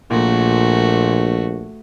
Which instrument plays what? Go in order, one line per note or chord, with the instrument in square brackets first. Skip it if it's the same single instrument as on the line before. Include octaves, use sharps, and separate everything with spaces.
[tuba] A#1 [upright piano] A#2 [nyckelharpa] A3 F#4